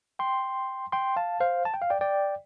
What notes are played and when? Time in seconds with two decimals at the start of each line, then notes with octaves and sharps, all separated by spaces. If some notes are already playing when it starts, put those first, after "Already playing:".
0.19 G5 C6
0.92 G5 C6
1.16 F5 A5
1.40 C5 F5
1.65 A5
1.74 G5
1.82 F5
1.90 D5 G5
2.01 D5 G5